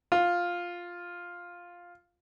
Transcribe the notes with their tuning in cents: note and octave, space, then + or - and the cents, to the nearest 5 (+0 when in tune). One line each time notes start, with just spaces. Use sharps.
F4 +5